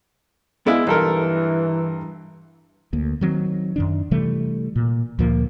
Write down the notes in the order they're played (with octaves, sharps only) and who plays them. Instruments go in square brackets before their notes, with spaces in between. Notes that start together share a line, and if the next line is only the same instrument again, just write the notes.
[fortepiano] G#3 E4 [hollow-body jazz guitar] B3 D5 F5
[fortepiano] B1 A4 A#4 [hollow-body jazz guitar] G2 [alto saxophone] E3
[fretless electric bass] D2 A#3
D#3 F#3 C4
F#2 D#3 D4
C3 E3 G3 A3
A#2
D2 A#2 F3 A#3